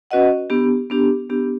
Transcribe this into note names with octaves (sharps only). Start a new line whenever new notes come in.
C#4 F#4 B4 D#5 F#5
B3 D4 G4
B3 D4 G4
B3 D4 G4